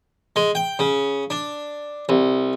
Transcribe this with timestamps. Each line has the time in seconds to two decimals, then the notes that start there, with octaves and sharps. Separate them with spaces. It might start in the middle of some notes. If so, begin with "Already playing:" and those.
0.36 G#3
0.55 G5
0.79 C#3
1.30 D4
2.09 C2